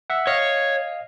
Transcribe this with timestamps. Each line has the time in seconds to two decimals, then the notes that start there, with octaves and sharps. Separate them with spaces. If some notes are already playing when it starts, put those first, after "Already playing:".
0.10 E5 F#5
0.27 C#5 D#5 F5